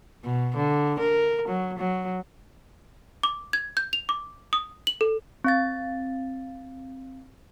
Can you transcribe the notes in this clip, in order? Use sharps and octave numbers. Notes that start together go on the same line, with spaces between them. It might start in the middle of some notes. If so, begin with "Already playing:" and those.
B2
D3
A#4
F#3
F#3
D6
G#6
G6
F7
D6
D#6
F#7
A4
C4 F5 A6